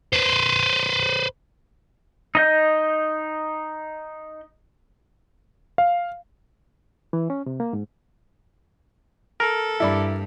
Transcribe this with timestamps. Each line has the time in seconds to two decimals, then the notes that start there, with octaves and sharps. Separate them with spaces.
0.13 B4 C5
2.35 D#4 D#5 G6
5.78 F5
7.13 E3
7.30 C#4
7.46 C3
7.60 A#3
7.73 G#2
9.40 A4 A#4
9.80 G2 E4 D5 B5